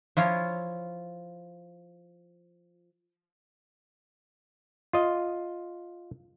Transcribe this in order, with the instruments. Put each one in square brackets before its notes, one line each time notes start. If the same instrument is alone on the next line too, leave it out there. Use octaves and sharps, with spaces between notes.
[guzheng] F3 E4 F4 C#5
[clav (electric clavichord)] F4 D#5